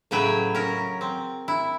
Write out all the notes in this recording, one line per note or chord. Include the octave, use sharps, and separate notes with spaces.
A2 C#3 F#3 B4 G5 G#5
C#4 A#4
C4
E4